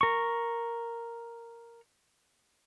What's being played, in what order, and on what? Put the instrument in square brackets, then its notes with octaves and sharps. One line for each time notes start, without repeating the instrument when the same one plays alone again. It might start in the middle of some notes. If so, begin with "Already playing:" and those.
[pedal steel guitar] A#4 C#6